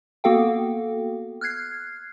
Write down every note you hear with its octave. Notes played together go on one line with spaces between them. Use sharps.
A#3 B3 F#4 A4 F5 G5
F6 F#6 G#6 C7